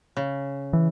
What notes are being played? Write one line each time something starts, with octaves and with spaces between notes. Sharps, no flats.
C#3
E3